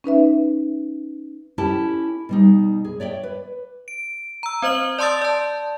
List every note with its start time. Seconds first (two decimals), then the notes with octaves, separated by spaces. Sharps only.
0.04 C#4 D#4 B4 E5
1.58 C#4 E4 G4 A4 A5
2.29 B2 G3 D#4
2.85 G#4
3.00 C#5 D5 E5 G5
3.23 B4
3.88 D7
4.43 A#5 E6
4.62 C4 C5 D#5 F#7 G7
4.98 D5 A5 C6 D#6 E6 A6
5.22 D5 A5